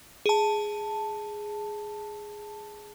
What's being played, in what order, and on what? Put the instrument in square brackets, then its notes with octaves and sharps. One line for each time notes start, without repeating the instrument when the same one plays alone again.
[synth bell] G#4 A5